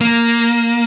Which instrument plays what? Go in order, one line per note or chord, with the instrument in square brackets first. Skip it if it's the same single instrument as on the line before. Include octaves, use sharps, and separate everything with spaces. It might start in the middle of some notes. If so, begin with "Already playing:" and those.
[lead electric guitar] A#3